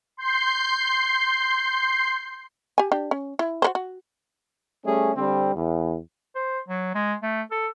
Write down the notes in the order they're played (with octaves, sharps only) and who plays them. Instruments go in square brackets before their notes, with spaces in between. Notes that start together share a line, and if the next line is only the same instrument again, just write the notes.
[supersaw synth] C6 G6 C7
[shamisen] G4 G#5
D4 G4
C#4
E4
F#4 B4 C5
F#4
[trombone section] G3 A3 C#4 G#4
D3 G3 C4
E2
[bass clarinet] C5
F#3
G#3
A3
A4